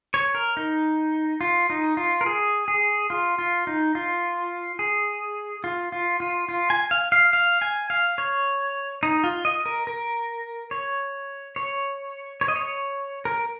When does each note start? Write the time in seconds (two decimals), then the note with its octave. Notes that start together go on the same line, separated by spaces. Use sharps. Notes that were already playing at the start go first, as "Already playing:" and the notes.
0.14 C#5
0.35 A#4
0.57 D#4
1.41 F4
1.70 D#4
1.97 F4
2.21 A#4
2.26 G#4
2.68 G#4
3.10 F4
3.39 F4
3.67 D#4
3.95 F4
4.79 G#4
5.64 F4
5.92 F4
6.20 F4
6.49 F4
6.70 G#5
6.91 F5
7.12 F5
7.33 F5
7.62 G#5
7.90 F5
8.18 C#5
9.03 D#4
9.24 F4
9.45 D#5
9.66 A#4
9.87 A#4
10.71 C#5
11.56 C#5
12.41 C#5
12.48 D#5
12.56 C#5
13.25 A#4